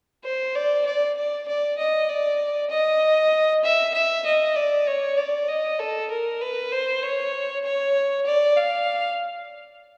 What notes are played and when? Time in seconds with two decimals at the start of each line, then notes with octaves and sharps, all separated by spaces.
0.25 C5
0.55 D5
0.86 D5
1.17 D5
1.48 D5
1.78 D#5
2.09 D5
2.70 D#5
3.64 E5
3.94 E5
4.25 D#5
4.56 D5
4.87 C#5
5.17 D5
5.48 D#5
5.79 A4
6.10 A#4
6.41 B4
6.72 C5
7.03 C#5
7.64 C#5
8.26 D5
8.57 F5